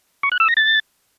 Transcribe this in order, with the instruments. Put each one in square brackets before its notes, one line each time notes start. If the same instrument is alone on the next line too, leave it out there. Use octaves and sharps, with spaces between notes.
[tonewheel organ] C#6
F#6
E6
A#6
A6